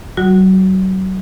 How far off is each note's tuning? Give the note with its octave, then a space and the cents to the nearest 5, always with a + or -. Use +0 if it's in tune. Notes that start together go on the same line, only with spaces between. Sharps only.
F#3 +35 F#4 -10